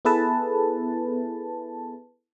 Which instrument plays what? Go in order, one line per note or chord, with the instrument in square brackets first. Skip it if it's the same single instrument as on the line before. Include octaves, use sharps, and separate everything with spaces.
[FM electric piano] B3 E4 G#4 A4 B4 A5